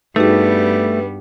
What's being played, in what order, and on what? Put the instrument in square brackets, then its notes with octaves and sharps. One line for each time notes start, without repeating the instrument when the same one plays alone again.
[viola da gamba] G2 G3 B3 [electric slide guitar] A3 [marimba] D#4 F#4 G#4 [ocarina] B4